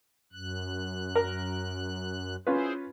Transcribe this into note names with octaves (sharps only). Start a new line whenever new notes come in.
F#2 F#6
A#4
C#4 E4 F4 G#4 B4 C5